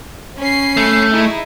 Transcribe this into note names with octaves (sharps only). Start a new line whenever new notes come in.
C#4 B5 C7
A3
D#4 E4 G#4